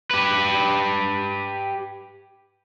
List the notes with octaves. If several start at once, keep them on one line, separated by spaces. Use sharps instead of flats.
G4 B4